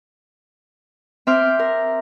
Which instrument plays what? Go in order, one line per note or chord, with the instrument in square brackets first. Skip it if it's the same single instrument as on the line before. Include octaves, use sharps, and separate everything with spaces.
[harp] C4 E5 C6 D6 F6 G6
A#4